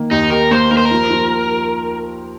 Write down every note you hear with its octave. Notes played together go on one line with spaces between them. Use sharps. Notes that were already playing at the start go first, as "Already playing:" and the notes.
Already playing: D#3 A#3
D#2 D#4
G4 A#4
A#3 C5
A#3 A#4
C5
A#4
F3
F3